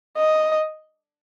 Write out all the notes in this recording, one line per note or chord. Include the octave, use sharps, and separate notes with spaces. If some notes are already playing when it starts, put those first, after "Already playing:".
D#5